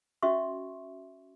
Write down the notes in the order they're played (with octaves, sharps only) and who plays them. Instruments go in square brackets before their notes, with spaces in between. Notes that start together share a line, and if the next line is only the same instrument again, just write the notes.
[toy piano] C#4 F#4 D#5 E5 C6 C#6